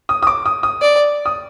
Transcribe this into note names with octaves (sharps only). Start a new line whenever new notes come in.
D#6
D#6
D6
D#6
D#6
D5
D#6